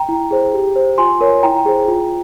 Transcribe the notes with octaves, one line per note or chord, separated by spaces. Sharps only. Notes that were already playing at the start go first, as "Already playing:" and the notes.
Already playing: G5 A#5
E4
G#4 C5
G4
C5
F4 G#5 C6
A#4 C#5
E4 G5 A#5
G#4 C5
F4